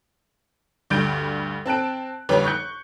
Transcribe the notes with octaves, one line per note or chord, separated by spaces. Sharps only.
D2 G2 G6 A6 D7
C4 A5 F#6 D7
G1 F2 G3 C#4 B4 C#5
C#6 F#6 G6 C#7